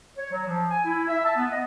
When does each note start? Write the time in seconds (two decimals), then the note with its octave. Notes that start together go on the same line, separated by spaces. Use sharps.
0.17 C#5
0.32 F#3
0.47 F3
0.71 G#5
0.84 E4
1.08 E5
1.24 A5
1.36 B3
1.50 D#5